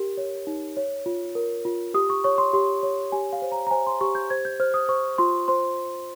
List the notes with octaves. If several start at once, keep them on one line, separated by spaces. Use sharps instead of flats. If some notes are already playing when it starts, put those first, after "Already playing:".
Already playing: G4 A#4
C#5
D#4
C#5
F4
A#4
F4
G4 D#6
C#6
C#5 C#6
C6
G4 C6
C#5
G4 G#5
F5
C5
A#5
A#5
C5 G#5
C6
G4 C#6
G6
C5 G#6
G6
C5 F6
D#6
C5 C#6
F4 C6
C5 C6